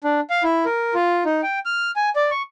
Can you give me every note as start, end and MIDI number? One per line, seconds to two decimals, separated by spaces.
0.04 0.20 62
0.30 0.43 77
0.44 0.65 64
0.65 0.94 70
0.94 1.24 65
1.25 1.41 63
1.43 1.59 79
1.65 1.91 89
1.96 2.10 80
2.16 2.30 74
2.31 2.42 85